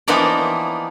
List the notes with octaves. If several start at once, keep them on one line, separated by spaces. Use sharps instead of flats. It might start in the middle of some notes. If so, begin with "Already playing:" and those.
E3 F3 A#3 B3 D#4 D5